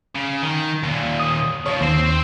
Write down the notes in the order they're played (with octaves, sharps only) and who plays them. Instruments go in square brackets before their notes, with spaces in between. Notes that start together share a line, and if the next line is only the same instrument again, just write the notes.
[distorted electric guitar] C#3
D#3
D#2 A#2
[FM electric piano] D#6
[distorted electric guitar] C#2 F3 [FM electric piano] C#5
[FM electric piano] D#2 [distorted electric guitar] C4 C5